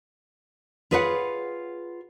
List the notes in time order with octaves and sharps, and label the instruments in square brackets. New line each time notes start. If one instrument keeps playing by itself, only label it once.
[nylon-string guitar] F4 G#4 B4 C#5 E5 F#5